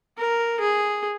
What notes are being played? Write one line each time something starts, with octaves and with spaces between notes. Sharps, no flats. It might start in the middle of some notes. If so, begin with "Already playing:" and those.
A#4
G#4